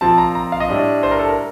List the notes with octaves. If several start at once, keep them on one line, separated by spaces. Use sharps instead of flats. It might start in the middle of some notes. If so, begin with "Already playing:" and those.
A#2 F3 C4 A5
A#5
A#5
F5
D#5
A2 G3 D4
C5
A#4
A4
A#4